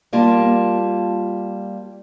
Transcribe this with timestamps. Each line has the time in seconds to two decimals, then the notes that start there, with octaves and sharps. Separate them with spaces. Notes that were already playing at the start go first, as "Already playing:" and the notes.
0.13 G3 A#3 F4 A5